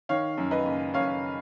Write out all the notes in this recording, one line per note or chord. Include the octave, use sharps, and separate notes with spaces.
D#3 C#5 F5
F#2
B4 D#5
F#1
F#2 C#5 F5